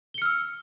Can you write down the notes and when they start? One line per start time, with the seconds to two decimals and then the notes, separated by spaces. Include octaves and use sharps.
0.14 G7
0.18 C#7
0.22 F6
0.25 E6